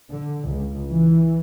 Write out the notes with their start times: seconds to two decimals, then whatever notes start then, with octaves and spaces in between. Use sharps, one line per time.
0.12 D3
0.50 C#2
0.89 E3